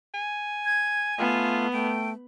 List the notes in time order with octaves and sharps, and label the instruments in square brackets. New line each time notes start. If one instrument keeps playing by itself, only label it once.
[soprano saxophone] G#5
[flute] G#6
[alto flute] A3 [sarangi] B3 [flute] F4
[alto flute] A3 [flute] G5